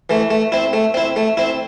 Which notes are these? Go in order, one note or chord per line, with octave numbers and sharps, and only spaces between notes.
E3 A3
A3
C4 E4
A3
C4 E4
A3
C4 E4